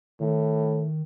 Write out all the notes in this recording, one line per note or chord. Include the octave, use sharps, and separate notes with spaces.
A2 D#3